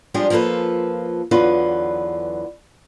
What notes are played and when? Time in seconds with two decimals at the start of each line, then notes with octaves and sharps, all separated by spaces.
0.14 F3 G3 G#3 D4 F4
0.30 F3 A#3 F4 A4 B4
1.31 E2 D3 F#3 F4 B4